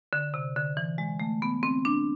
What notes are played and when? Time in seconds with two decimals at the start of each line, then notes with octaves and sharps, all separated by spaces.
0.13 D3
0.34 C3
0.56 D3
0.77 E3
0.98 G#3
1.20 A3
1.42 B3
1.63 C4
1.85 D4